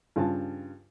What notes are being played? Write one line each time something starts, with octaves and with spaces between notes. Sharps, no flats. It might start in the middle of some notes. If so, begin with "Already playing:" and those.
G2 C#3 F4 G#5 A5